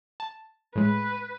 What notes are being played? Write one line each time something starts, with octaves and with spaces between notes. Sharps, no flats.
A5
A2 G#3 B4